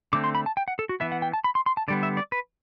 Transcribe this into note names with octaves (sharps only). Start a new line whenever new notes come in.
D3 A3 C4 D6
C6
B5
A5
G5
F#5
A4
F#4
E3 B3 E5
F#5
G5
A5
B5
C6
C6
A5
D3 G3 B3 D5
E5
D5
B4